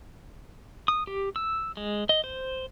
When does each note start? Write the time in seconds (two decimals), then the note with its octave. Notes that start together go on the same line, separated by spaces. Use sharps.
0.88 D#6
1.07 G4
1.36 E6
1.77 G#3
2.09 D#5
2.24 C5